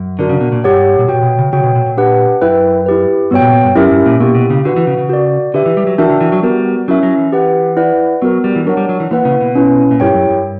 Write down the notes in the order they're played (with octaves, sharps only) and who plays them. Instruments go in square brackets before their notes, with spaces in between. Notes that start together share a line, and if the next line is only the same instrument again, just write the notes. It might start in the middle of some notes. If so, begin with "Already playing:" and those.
Already playing: [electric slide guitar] F#2
[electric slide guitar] D3 [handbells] D4 F#4 A#4 D5
[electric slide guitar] C#3
B2
A#2
[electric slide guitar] G2 [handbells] G4 C#5 F#5
[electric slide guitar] A#2
[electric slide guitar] B2 [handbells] F#4 C#5 G5
[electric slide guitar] B2
C#3
[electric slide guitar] C#3 [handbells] F#4 C#5 G5
[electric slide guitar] B2
A#2
A#2
[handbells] D4 G4 B4 F#5
[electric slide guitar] F#2 [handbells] E4 B4 E5 G5
[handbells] E4 G4 B4
[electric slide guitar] G2 [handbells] B3 F#4 C#5 G5
[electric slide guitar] A#2
A#2
G2
[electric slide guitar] F#2 [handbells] C#4 E4 G4 A#4 E5
[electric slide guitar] G2
A#2
[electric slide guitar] B2 [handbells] A#3 E4 G4
[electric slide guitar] B2
C#3
[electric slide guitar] D3 [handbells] F#4 B4 F#5
[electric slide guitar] E3
C#3
C#3
[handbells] F#4 A#4 D5
[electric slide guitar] D3 [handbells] G4 B4 E5
[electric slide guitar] E3
G3
F#3
[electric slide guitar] E3 [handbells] D4 F#4 A#4 E5 G5
[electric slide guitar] D3
E3
F#3
[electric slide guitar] G3 [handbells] B3 F#4 A#4 D5
[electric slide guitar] F#3 [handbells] C#4 E4 A#4 E5
[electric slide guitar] F#3
E3
[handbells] G4 B4 F#5
E4 B4 D5 F#5
[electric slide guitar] F#3 [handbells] B3 F#4 A#4
[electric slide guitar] G3
E3
[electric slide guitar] F#3 [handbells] D4 A#4 C#5 F#5
[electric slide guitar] G3
F#3
E3
[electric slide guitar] E3 [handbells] A#3 E4 B4 F#5
[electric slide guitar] C#3
B2
[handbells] C#4 E4 B4
[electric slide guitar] A#2
[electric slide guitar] G2 [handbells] E4 G4 A#4 C#5 G5
[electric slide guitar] F#2
G2